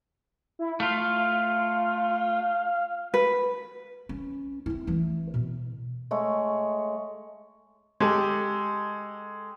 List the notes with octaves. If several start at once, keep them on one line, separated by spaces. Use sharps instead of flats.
E4
A3 F4 F5
B4
C#4
C4 E4
E3 A3
B2
G#3 A3 C#5
G#3 G4 A4